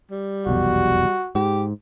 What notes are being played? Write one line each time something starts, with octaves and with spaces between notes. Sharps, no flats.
G3
F1 B1 E2 F#4
G#2 G4